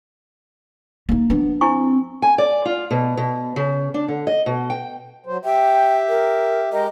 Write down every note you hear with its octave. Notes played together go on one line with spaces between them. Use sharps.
A#3 D#4
F3 B3 D4
C4 E4 G#5 C#6
G#5
D5
F4
B2
B2
C#3
D4
D3
D#5
B2
G5
F#3 C5
G4 E5 G5
A#4
G#3 G4 A#4 D#5